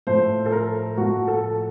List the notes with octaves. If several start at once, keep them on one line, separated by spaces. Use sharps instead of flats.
A2 F3 A3 C5
A4
A#4
A2 F3 A3 F#4
A4